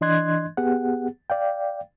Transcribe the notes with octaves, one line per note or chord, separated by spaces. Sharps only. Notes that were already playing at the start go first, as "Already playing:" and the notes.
E3 D4 D#5 C6 F#6 G#6
B3 G4 G#4 F#5
D5 F5 G5